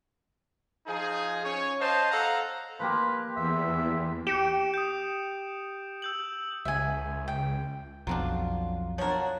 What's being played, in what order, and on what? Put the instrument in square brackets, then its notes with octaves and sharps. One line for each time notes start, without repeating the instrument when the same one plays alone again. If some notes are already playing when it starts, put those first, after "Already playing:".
[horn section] F3 D#4 G#4
C#4 C#5
C5 D#5 F5 A5
A4 F5 F#5 A#5
[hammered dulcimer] F3 A#3 G4 [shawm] B4
[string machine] E2 [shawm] E5
[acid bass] G4 [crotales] C#7 D7 E7
[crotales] D#6 G6
E6 G6 F#7
[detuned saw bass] C#2 [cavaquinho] E5 G#5
[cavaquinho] G5
[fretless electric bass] B1 F2 [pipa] F#3 C4 D4 [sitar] F4
[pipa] F3 A#4 [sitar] D4 F#4 C#5